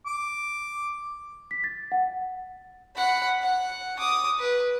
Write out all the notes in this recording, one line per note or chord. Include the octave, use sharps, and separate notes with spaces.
D6
B6
A6
F#5
F#5 B5
F#5
D6 D#6
B4